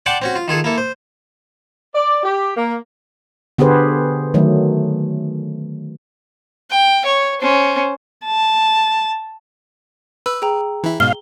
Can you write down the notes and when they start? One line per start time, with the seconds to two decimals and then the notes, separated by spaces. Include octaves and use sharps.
0.06 D5 F#5 G5 A5 C6 D6
0.22 C4 C#4 F#4
0.36 F4
0.48 D#3 F4 G#4 A4
0.64 A#3 E4 A4
0.78 C5
1.94 D5
2.23 G4
2.56 A#3
3.58 D3 B3 G4 G#4 B4 C5
4.34 D#3 F#3 A3
6.70 G5
7.05 C#5
7.40 C#4 C5
8.25 A5
10.26 B4 E6
10.42 G#4 G5 A#5
10.83 E3 E4
11.00 G#2 B2 F5 G7